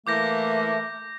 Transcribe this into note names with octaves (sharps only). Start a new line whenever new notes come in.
E3 A3 A#3 D6 G6 A#6